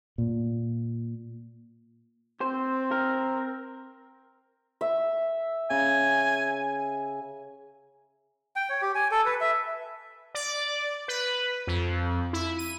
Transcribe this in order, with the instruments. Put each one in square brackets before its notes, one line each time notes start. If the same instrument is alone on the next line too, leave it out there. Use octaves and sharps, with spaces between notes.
[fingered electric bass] A#2
[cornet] C4 [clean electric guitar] C5
[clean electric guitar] A#4
[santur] E5
[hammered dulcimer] C#3 [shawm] G#5
[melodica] G5
C#5
G4
G#5
A4
B4
E5
[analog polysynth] D5
B4
F2
E4
D#7